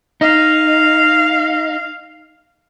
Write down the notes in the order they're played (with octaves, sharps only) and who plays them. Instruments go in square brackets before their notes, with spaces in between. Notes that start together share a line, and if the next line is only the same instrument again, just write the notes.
[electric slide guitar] D#4 [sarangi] F5